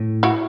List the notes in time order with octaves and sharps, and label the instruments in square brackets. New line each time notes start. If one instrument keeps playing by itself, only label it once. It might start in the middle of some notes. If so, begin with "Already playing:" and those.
Already playing: [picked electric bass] A2
[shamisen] E4 F#4